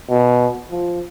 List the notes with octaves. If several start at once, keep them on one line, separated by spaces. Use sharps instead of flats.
B2
F3